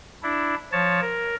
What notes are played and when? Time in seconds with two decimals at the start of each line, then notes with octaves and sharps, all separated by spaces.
0.23 D4 E4
0.72 F3 C#5 A5
1.01 A#4